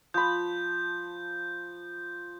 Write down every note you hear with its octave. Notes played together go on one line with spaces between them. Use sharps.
F3 B5 G6